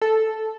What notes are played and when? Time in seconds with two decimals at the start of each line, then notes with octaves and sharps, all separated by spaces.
0.02 A4